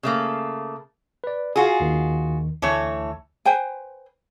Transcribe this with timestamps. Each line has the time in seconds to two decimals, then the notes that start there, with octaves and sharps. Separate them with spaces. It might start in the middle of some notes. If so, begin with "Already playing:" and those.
0.03 C#3 A3 A#3
1.24 B4 D5
1.56 F4 F#4 G#4 G#5
1.80 D#2 D#3
2.62 D2 E3 A3 C#5
3.45 B4 C5 G5 G#5